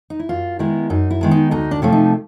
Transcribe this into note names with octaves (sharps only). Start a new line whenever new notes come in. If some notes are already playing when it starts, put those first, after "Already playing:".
D#4
E4
F#2 F4
D#3 G#3 B3 E4
F#2 D#4
E4
D#3 G#3 B3
D#4
D2 D#4
D4
C3 F3 A3 C#4
D#4